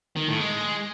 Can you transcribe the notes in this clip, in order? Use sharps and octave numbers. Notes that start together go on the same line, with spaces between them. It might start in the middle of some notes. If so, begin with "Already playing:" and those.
D#3
A2
G#3